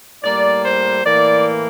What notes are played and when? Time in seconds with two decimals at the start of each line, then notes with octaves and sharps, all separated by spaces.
0.22 A2 G3 A#3 D5
0.63 C5
1.05 A2 E3 A#3 D5